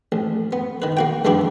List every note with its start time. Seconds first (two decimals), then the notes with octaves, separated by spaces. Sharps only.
0.12 A1
0.52 B3
0.82 D#3 B4
0.97 A#3 F#4 G5
1.25 A#1 G2 E3 D4 E4 G4